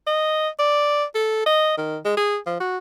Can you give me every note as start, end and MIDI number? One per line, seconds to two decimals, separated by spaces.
0.07 0.49 75
0.59 1.04 74
1.15 1.44 69
1.46 1.76 75
1.78 1.98 51
2.05 2.15 56
2.17 2.37 68
2.46 2.56 53
2.60 2.78 66